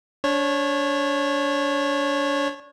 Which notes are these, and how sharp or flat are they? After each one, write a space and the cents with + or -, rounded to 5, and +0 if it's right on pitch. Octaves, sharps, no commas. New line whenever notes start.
D4 -30 C#5 -20